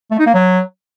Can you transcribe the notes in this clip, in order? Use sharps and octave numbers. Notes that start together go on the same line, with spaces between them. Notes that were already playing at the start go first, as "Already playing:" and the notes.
A3
D#4
A#3
F#3